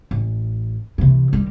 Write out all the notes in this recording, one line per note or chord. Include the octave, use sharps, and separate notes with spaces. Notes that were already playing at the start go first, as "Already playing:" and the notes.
A1
C3 E3
D#3 G3